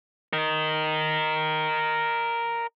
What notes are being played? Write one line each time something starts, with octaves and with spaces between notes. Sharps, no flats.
A#4 D#5